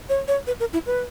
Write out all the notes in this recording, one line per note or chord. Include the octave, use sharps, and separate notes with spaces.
C#5
C#5
B4
A#4
E4
B4